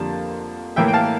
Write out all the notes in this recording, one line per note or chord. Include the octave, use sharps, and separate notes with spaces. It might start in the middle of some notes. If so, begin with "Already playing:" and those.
Already playing: F2 D3 G3 A#3 D4 A5
A2 E3 A#3 E4 E5 G5
G5
F5 A5